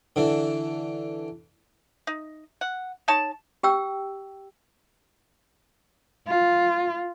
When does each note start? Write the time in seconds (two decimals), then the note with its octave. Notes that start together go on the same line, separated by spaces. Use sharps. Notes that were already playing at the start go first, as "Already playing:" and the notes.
0.16 D3 E3
2.07 D#4
2.61 F#5
3.08 D#4 C#5 A5
3.63 G4 G5 E6
6.27 F4